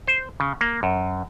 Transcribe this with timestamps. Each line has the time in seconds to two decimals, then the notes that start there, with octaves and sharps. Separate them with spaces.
0.07 C5
0.40 C#3
0.61 A#3
0.83 F#2